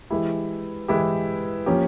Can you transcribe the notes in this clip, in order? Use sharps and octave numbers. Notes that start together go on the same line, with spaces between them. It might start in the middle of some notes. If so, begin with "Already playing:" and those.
E3 G#3 E4 G4
E3 G#3 E4 G4
F3 A#3 C#4 G4